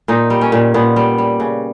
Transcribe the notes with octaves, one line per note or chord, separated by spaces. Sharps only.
A#2 D#4
G3
C#4
A#2
A#2 B3
G3
G3
C#3